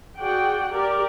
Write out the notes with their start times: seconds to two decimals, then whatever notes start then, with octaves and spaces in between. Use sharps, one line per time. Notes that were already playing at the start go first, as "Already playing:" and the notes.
0.19 F#4 G#4 D5 F#5 G5
0.70 G4 A#4 D5